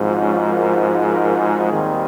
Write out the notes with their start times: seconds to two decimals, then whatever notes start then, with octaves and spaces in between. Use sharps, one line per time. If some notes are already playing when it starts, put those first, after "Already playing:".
Already playing: G#1 G#2 F3
0.18 C#4
0.49 A#4
1.09 A#4
1.40 G#4
1.71 D#2 D#3 G3 C4 G#4